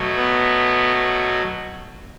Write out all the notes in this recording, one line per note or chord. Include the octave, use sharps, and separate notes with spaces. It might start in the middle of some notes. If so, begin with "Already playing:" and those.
Already playing: B2 F#3 A3
B3